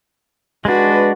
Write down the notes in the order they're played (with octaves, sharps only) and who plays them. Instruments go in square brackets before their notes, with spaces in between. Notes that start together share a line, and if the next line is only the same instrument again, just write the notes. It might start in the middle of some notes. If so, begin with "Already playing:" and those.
[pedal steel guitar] G#3 D4 [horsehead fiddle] F#4 B4